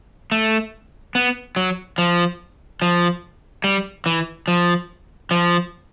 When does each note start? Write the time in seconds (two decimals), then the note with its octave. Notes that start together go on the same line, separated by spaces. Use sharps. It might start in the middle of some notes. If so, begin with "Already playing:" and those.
0.32 A3
1.15 B3
1.56 F#3
1.98 F3
2.82 F3
3.64 G3
4.06 E3
4.48 F3
5.31 F3